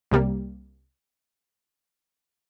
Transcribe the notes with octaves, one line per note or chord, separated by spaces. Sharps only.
C2 C3 G3 A#3